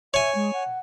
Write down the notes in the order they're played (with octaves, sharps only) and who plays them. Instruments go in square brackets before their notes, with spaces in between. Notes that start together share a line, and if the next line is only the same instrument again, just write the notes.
[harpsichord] C#5 G#5 [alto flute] E5
[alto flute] G#3
F#5